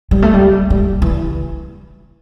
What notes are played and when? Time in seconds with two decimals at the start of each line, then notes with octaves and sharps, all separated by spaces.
0.11 G3
0.22 A3
0.34 G3
0.70 G3
1.02 E3